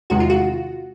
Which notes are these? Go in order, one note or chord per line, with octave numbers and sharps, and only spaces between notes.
E2 C3 D#3 G#3 F#4
F4
F#4